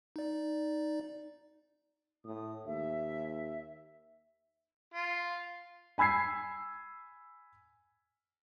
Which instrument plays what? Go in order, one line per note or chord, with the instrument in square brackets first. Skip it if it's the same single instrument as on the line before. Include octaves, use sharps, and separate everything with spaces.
[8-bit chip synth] D#4 D5
[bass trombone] A2 [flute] D#6
[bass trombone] D#2 [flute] E5
[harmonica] F4
[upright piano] G#5 B5 E6 G#6 C7